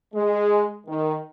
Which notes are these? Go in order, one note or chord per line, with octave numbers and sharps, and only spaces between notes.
G#3
D#3